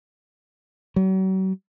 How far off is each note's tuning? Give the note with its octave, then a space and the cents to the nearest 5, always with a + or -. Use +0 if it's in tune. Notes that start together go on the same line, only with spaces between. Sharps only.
F#3 +40